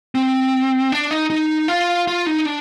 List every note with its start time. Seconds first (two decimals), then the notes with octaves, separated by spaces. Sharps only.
0.15 C4
0.92 D4
1.11 D#4
1.30 D#4
1.68 F4
2.07 F4
2.26 D#4
2.46 D4